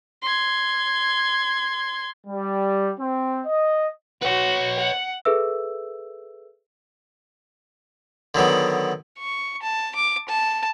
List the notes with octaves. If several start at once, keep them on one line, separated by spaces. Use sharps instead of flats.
C6 G#6
G3
C4
D#5
F#4 B4 C#5
F#5
G#4 A4 B4 E5 E6
D3 D#3 F#3 B3
C#6
A5
D6
A5